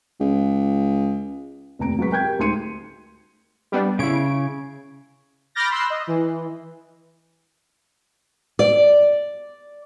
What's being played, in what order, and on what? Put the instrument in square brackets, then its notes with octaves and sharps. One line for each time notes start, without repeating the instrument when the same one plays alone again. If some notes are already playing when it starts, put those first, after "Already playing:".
[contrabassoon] C#2
[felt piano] F1 D#2 C4 A#5 D7
F#3 G#3 C4 B4 C#6 B6
A#4 G5 G6 G#6
G4
D2 G#3 D#4 C6 C#7 D#7
[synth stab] G3 B3 D4
[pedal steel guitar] C#3 C#5 [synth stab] E4 D7
[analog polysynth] B5 D6 F6 G6 A6 A#6
B5 C6 E6 F#6
D#5
E3
[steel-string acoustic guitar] D5